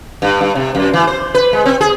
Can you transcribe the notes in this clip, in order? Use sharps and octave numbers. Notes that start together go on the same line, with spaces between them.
G2
G2
C3
F#2
E3
C5
B4
G#3
C4
G#4